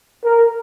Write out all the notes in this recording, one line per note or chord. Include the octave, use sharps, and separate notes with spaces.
A#4